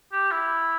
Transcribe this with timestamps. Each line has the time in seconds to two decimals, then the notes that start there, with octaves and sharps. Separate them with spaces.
0.12 G4
0.31 E4